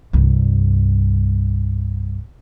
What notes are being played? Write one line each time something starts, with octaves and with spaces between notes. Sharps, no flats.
C2 G2